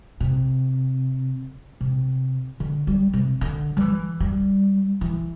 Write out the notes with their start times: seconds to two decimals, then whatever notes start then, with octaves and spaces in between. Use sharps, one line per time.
0.20 C3
1.81 C3
2.60 D3
2.87 G3
3.13 C3
3.41 D3
3.77 G3
3.80 E3
4.20 G3
5.01 E3